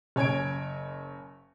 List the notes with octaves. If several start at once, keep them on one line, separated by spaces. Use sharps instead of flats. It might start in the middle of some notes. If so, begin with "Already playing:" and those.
F#1 C#5 G#5 G#6 D7